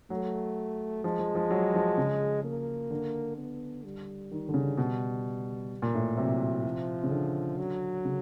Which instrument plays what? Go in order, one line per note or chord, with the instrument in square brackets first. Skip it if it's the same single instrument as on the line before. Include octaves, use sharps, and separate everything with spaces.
[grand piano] F#3 [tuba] A3
[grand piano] F3 [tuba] G#3
[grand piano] F3
F3
F#3
F3
C#3
[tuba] A#3
[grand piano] D3
[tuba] B3
G3
[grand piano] D#3
D3
C#3
[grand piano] B2 [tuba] G3
[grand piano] A#2
A2
[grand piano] C3 [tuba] F#3
[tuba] F3
[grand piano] C#3
D3
[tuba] F#3
[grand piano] C#3